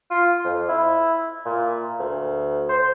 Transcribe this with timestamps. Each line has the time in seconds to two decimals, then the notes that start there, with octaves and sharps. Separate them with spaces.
0.11 F4
0.44 F2
0.69 E4
1.46 A#2
1.99 D2
2.69 C5